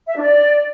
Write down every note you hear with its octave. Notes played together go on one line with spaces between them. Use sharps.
E5
D4
D5